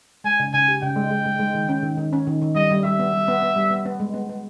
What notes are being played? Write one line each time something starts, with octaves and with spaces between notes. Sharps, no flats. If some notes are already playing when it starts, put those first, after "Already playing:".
G#3 G#5
C#3
C#3 G#5
G4
C#3 G5
G#3
G#3
G#3
G#3
D#3
C#4
D#3
D#3
C#4
D#3
D#3
G3 D#5
G3
G3 E5
B3
G3
B3
B3
G3
B3
B3
G#3
B3
B3